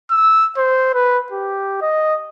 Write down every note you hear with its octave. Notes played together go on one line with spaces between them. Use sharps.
E6
C5
B4
G4
D#5